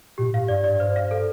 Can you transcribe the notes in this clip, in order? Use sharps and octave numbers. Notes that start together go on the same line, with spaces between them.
A#2 G4
A2 F5
G2 D5
D5
C5
F5
A4